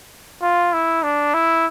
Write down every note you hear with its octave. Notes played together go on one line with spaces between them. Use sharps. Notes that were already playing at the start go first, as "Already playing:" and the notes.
F4
E4
D4
E4